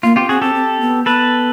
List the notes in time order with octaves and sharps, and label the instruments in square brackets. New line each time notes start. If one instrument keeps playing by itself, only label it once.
[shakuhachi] A#3 [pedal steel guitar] F4
[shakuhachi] C4 [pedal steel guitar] F4 G4
[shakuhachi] C4 [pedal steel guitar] F#4 G#4
[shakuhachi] C4 [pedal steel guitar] G4 A4
[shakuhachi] C4
B3
[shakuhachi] B3 [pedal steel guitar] A4 B4